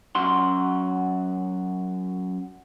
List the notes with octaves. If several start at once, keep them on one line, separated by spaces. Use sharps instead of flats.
F#2 F#4 C6